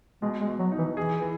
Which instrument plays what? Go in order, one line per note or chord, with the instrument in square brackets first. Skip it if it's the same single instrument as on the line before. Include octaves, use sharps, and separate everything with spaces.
[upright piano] B2 [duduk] G#3
[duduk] G#3
[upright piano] B2
[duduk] F#3
[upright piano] D#4
[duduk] E3
[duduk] E3 [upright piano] G#4
[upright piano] E3